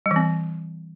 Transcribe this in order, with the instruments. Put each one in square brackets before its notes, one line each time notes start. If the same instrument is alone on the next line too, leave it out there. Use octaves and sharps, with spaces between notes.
[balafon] G3
E3
C4